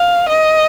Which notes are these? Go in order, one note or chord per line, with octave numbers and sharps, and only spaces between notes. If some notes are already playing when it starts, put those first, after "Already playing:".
Already playing: F5
D#5